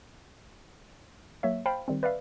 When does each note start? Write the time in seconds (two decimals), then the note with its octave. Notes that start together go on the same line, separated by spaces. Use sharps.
1.43 F#3 A#3 C#5 E5
1.66 C5 F5 G5 A5 B5
1.88 D#3 G3 C4
2.03 B4 D5 E5 F5